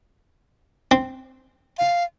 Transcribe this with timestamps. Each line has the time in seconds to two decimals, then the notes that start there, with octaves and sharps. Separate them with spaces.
0.91 C4
1.78 F5